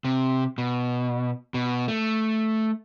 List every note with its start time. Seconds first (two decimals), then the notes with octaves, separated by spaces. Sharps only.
0.05 C3
0.58 B2
1.54 B2
1.88 A3